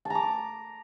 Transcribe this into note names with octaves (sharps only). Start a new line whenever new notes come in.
A5 A#5 D6